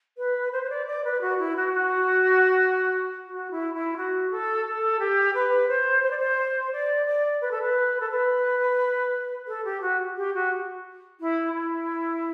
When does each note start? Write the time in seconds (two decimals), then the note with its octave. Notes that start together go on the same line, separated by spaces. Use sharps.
0.18 B4
0.53 C5
0.63 C5
0.70 D5
0.86 D5
1.05 B4
1.21 F#4
1.39 E4
1.56 F#4
1.74 F#4
3.28 F#4
3.51 E4
3.74 E4
3.97 F#4
4.31 A4
4.66 A4
4.99 G4
5.35 B4
5.68 C5
6.03 C5
6.11 D5
6.19 C5
6.72 D5
7.06 D5
7.41 B4
7.51 A4
7.62 B4
8.00 A4
8.10 B4
9.47 A4
9.65 G4
9.81 F#4
10.17 G4
10.34 F#4
11.20 E4
11.54 E4